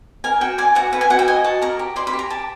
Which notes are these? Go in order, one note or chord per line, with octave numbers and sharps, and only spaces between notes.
A#4 G#5
F#4 G5
D5 G#5
F#4 F#5
B4 F#5
G#5
F#4 F#5
G5
D#5 G#5
F#4 A5
A#4 A#5
G4
D5 C6
B5
G4
A#5
G4 A5